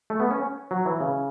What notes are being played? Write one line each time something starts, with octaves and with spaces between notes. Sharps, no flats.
A3
B3
C#4
F#3
E3
C#3